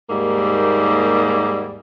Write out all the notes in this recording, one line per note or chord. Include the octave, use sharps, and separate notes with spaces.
D#2 G#2 G3 A#3